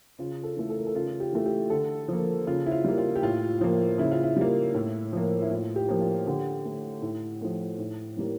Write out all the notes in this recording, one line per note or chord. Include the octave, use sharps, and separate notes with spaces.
C#3 F4
A4
E3 A3
A4
A#4
A4
C#3 F4
G4
E3 A3
G4
D3 A4
F3 A#3
C#3 F4
E4
F4
G3 A#3
F4
G4
A2 F4
F3 A#3
C#3 E4
F4
E4
G3 A#3
A2
F3 A#3
E4
A2 F4
G4
F3 A#3
F4
D3 G4
A3
A2
F3 A3
A2
E3 G3 A#3